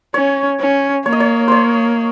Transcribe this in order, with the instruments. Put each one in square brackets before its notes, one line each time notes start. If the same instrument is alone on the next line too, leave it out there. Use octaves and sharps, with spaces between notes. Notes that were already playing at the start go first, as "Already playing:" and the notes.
[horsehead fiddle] C#4 [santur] C#5
[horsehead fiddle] C#4
[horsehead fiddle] A#3 [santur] C#5
[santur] D#5
C#5
C5 C#5